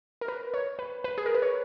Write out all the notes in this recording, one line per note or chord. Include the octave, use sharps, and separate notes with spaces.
A#4
B4
C#5
B4
B4
G#4
A#4
B4
C#5